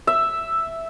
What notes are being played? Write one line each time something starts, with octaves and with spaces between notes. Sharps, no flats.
E5